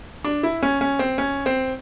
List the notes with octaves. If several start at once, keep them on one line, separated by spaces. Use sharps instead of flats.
D4
E4
C#4
C#4
C4
C#4
C4